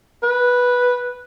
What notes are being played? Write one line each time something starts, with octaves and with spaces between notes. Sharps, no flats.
B4